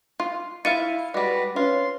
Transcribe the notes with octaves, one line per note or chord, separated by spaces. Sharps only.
F4 C6
E4 F4 E5 F5 A6 C#7 D#7
G3 G#3 F#4 B4 D5
C#4 F4 B4 C6